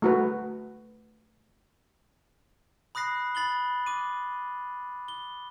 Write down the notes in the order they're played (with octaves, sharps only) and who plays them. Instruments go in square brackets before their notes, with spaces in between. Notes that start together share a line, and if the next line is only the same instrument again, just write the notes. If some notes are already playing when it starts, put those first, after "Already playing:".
[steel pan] A3 F#4 B4
[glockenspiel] B5 D#6 F#6 A#6 C7
B5 A6 F#7 G7
D6 D#7
G7